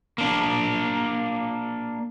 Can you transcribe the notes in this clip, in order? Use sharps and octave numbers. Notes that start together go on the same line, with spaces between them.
A#3 D4